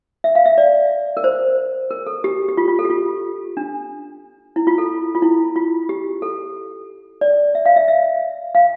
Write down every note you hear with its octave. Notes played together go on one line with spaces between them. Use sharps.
E5
F5
E5
D5
A#4
C5
A#4
A4
G4
G4
F4
F4
A4
G4
F4
D4
E4
F4
A4
F4
E4
F4
G4
A4
D5
E5
F5
E5
E5
F5